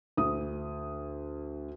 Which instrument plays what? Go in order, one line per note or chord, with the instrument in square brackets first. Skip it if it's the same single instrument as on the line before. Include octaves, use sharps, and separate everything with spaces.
[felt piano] D2 D#6